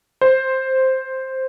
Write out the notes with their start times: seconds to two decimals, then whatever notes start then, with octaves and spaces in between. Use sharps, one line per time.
0.21 C5